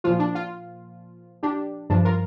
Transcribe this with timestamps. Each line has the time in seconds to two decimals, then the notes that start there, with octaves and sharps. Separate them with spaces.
0.04 A#2 F3 F4
0.19 D4
0.35 F4
1.43 D4 G4
1.90 G2 F3 D4
2.05 F4 A#4